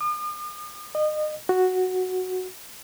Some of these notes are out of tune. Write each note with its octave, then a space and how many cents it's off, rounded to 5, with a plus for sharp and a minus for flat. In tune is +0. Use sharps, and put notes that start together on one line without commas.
D#6 -45
D#5 -30
F#4 +0